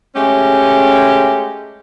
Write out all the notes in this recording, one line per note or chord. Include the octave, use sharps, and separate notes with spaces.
G#3 A3 C#4 G4